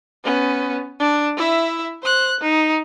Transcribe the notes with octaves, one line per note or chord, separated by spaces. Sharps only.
B3 C#4
D4
E4 E5
C5 F#6
D#4